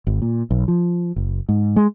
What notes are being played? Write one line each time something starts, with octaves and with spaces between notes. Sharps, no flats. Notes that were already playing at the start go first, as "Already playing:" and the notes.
G#1
A#2
B1
F3
F#1
G#2
G#3